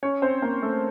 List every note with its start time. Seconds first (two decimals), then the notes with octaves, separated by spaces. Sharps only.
0.03 C#4 C#5
0.22 C4 C5
0.42 A#3 A#4
0.62 A3 A4